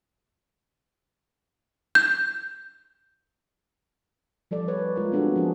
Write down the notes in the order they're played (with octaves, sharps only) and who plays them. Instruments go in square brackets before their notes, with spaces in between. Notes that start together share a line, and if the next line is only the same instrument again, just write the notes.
[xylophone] G6
[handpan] F3 G3 A4 D5
B4 C#5
G#3 F4 A#4
B3 C4 D4 F#4 G#4 A4
F3 G#4